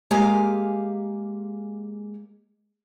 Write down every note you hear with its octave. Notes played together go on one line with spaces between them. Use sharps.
G#3 A#3 G4 F5 G#5